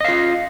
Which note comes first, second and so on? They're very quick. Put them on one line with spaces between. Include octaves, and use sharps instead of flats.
D#5 F5 F4